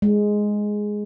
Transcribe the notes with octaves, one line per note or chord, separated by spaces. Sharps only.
G#3